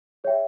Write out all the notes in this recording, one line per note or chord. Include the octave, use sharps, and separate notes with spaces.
G#4 C#5 E5 G5